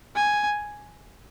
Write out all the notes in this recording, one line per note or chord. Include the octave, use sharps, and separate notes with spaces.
G#5